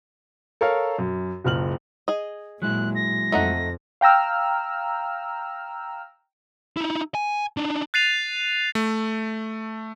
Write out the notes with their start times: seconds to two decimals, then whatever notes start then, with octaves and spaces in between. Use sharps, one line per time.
0.61 A4 A#4 C#5 F5
0.99 F#2
1.44 F#1 C#2 F6 F#7
2.08 G#4 D#5
2.62 A#2 F#3 G#3 E4 F#6
2.95 A#6
3.32 F2 A3 D#4 F#5
4.01 F5 G5 A#5 E6 F6
6.77 D#4 E4
7.15 G#5
7.57 D4 D#4
7.94 F#6 A6 C7 D#7 F7
8.75 A3